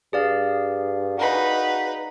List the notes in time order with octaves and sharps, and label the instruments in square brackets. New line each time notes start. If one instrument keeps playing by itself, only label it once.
[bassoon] G2 [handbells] G#4 D5 F5
[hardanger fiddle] D#4 B4 [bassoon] F#4